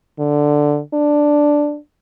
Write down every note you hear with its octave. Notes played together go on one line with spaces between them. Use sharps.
D3
D4